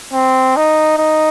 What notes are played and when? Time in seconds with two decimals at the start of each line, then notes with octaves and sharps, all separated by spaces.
0.14 C4
0.57 D#4
0.98 D#4